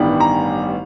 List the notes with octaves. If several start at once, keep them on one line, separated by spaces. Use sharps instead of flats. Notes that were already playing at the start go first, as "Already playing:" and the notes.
Already playing: A1 G2 D#3 G3 B3
A#5